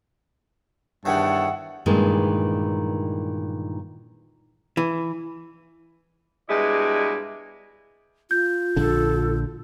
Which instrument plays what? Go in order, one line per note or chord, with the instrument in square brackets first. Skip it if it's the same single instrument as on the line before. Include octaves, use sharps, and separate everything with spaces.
[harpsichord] E2 D#3 E3 [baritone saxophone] G2 [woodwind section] C#5 A5 E6 [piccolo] F#5
[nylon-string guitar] G2 A#2 D#3 E3 G#3
[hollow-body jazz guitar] E3
[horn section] G2 B2 G#3 E4 D5 G#5
[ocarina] F4 [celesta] G6
[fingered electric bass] A#1 D3 [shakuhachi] A4